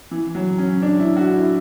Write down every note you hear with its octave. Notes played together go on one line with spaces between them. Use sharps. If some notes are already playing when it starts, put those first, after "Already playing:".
E3
F#3
C#4
D4
E4
F#4
E4